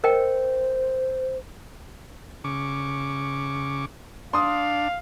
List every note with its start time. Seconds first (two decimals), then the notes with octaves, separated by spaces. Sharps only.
0.04 A#4 C5 D#5 G5
2.44 C#3 C#6 D6
4.33 D4 F5 C6 D#6